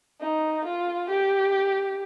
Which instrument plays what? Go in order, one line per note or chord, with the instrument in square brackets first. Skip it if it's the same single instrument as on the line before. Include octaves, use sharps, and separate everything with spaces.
[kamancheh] D#4
F4
G4